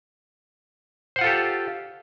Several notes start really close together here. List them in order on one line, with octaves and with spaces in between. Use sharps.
C5 F#5 F4 A4 G4